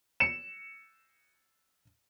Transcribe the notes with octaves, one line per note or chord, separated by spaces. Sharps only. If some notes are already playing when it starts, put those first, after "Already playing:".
C#7 E7